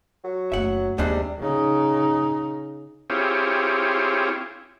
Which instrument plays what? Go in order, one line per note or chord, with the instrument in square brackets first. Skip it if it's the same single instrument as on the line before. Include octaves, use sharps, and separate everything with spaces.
[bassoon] F#3
[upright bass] F#1 A3 [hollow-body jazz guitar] E5 F#5
[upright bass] D#2 [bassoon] C3 [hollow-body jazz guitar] G3 G#3 D4
[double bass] C#3 D#4
[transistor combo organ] C4 E4 F4 G4 G#4 C#5